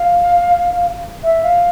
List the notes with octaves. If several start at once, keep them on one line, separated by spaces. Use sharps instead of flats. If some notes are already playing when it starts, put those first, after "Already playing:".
Already playing: F5
E5
F5